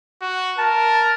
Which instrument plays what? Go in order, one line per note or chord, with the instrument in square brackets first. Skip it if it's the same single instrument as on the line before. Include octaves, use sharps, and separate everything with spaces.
[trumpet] F#4
[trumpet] A#4 [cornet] A5